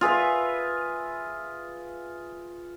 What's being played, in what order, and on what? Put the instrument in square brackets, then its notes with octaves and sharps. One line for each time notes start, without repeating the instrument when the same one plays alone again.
[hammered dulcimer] F4 G#4 B4 E5